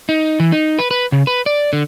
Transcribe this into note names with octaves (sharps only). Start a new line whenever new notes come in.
D#4
E3
D#4
B4
B4
C#3
B4
D5
D3